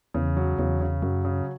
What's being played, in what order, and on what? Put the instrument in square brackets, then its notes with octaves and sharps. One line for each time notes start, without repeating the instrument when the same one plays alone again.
[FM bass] E2 [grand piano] C#3
[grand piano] F#3
[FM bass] E2 [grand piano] C#3
[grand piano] C#3
[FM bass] F#2 [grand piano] F#3
[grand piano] C#3